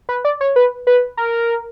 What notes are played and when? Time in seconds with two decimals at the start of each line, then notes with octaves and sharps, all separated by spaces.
0.09 B4
0.25 D5
0.41 C#5
0.56 B4
0.87 B4
1.17 A#4